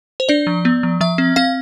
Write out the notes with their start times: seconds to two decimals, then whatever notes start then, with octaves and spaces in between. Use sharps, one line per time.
0.20 C5
0.29 D4 D5
0.47 F3
0.65 B3
0.83 F3
1.01 F3 E5
1.18 C4
1.36 C4 F5